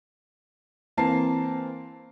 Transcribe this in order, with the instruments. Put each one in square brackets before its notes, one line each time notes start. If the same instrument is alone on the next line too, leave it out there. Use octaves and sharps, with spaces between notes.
[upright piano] E3 A#3 C4 A5 C7